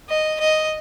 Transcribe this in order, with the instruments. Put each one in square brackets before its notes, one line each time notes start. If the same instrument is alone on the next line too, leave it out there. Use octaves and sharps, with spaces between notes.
[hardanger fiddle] D#5
D#5